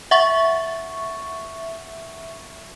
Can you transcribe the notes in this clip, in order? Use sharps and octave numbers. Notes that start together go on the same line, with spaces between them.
E5 F#5 C#6 A6